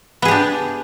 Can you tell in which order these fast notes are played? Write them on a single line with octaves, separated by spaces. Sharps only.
B3 G#4 G4 D4